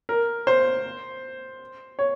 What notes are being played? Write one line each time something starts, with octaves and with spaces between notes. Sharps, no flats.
A#4
C5
C#5